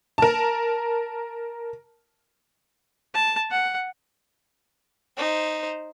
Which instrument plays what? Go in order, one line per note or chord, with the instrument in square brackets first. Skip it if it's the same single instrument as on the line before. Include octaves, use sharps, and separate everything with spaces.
[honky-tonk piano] A#4 A5
[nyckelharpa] A5
F#5
[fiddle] D#4 C5